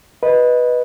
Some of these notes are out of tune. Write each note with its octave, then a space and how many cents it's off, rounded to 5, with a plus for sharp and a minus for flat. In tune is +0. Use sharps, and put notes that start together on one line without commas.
B4 -5 D#5 +0